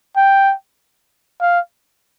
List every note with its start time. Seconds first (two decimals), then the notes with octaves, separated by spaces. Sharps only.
0.17 G5
1.41 F5